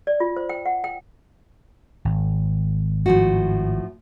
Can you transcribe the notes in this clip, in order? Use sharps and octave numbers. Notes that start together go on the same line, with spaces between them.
D5
F4
C5
G5
F#5
G5
G#1
A2 F3 F#4